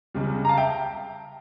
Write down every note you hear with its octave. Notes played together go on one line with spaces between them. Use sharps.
C#2 C#3 G3
A#5
F5 A5
E5 G5